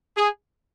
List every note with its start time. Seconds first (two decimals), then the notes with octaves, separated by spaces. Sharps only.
0.17 G#4